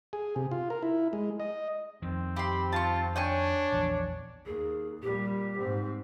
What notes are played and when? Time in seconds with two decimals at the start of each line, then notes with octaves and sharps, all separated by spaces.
0.13 G#4
0.36 C3
0.51 F4
0.70 A#4
0.83 E4
1.13 G#3
1.40 D#5
2.02 F2 D#3 C4
2.36 G4 B5 C6
2.72 F4 A5 C#6
3.16 D4 C#5 G5 G#5 C#6
3.72 A#1 E2
4.46 D#2 G#4
5.02 A#2 G3 G4
5.58 G#2 C4